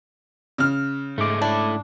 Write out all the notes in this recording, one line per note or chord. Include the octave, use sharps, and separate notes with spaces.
C#3 F6
G#2 G#3 A3 D6
A3 D4 E4